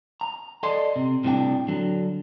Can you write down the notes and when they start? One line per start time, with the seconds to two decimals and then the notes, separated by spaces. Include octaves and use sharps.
0.21 A#5
0.63 A4 D5 D#5 C6
0.96 C3
1.24 C2 A2 C3 E3 D4 G5
1.68 D3 F#3